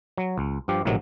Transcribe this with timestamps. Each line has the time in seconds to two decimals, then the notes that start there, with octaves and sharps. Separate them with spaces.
0.18 F#3
0.38 C#2
0.68 G2 F3 G4
0.85 A#1 A2 C3 D#3 F#3